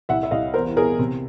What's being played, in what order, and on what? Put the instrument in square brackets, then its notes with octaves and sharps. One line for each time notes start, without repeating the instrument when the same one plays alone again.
[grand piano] C2 E5 F#5
E5
C2 D#5 F5
E2 A#4 C5
B2 G#4 A#4
C3